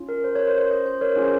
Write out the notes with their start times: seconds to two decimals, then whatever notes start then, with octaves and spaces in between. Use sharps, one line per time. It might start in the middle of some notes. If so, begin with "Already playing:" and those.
Already playing: C#4 F4
0.09 A#4
0.24 C5
0.35 A#4 C#5
0.47 C5
0.58 C5
0.70 C5 D#5
0.86 C5
1.01 A#4 C#5
1.16 C#4 F4 G#4
1.23 C5